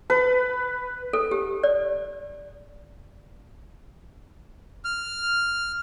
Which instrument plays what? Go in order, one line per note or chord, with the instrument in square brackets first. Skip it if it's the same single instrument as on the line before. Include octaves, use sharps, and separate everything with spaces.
[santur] B4
[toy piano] A4
G4
D5
[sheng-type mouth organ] F6